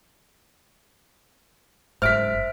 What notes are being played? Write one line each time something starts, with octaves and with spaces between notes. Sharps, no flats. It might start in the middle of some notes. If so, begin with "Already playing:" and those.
F#1 G#2 C5 E5 F6 B6 D7